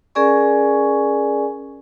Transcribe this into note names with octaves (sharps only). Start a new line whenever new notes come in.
C#4 G#4 A#4 D5 G#5 C#6